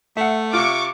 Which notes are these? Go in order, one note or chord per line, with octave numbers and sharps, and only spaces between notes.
A3 E5 F#5
C3 F4 C#6 D6